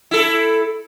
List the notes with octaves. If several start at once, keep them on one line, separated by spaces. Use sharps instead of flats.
E4 A4